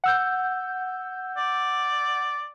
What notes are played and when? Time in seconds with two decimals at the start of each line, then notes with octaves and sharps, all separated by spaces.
0.04 F#5 E6 G6
1.37 D5